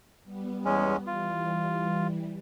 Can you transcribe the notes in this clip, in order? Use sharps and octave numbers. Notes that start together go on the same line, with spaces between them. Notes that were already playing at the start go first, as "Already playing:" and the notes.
G3 B3
E2 G#3 C#4
E3 G3 F4